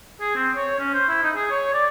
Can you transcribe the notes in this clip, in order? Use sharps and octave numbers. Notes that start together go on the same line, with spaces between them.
G#4
C4
C#5
C#4
C5
E4
D#4
G#4
C#5
D5